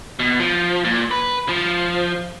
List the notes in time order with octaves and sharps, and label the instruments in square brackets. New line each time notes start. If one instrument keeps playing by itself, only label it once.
[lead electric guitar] B2
F3
A#2
B4
F3